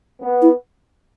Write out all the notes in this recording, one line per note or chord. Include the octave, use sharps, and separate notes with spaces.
B3
E4